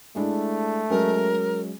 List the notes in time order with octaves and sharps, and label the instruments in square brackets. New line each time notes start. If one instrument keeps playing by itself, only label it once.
[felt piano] G#3 D4 E4 [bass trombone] A3
[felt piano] F#3 G#3 C#4 [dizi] A#4